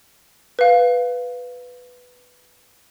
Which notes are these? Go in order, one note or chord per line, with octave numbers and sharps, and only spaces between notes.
B4 F5